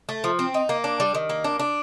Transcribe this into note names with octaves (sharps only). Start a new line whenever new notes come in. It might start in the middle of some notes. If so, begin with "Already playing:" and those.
A3
F3
C4
D#4
A#3
D4
G3
D#3
A#3
D4
D4